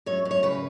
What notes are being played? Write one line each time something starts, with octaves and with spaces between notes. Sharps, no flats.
F#2 C#5
F#2
C#5
C#3 B4